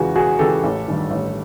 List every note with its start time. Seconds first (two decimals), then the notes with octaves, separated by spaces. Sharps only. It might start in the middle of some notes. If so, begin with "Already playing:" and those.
Already playing: E2 C#3 E3 G#3 F#4
0.15 E2 F#4 G#4
0.39 C#3 E3 G#3 G4 A4
0.64 A1
0.88 G2 D#3
1.11 A1